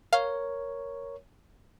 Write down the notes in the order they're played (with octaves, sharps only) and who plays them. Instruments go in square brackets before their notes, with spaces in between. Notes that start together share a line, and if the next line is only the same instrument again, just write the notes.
[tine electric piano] A#4 C#5 [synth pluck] F5